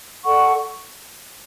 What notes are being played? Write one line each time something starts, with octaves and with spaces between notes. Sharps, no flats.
A4 D5 F#5 C#6